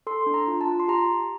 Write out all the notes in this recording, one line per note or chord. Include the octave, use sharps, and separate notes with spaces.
A4 C6
D4
A#5
F4
A5
F4
C6
G4 A#5
G4